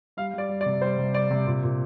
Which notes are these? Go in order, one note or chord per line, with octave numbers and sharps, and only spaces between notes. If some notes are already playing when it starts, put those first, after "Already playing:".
G3 F5
G3 D5
G3
D5
C3
G3 C5
C3
G3 D5
C3
A#2
A#2